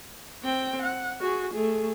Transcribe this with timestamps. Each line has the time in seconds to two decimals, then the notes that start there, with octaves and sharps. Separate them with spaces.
0.44 C4 G5
0.82 F#5
1.21 F#4 G#4
1.53 A3 G#4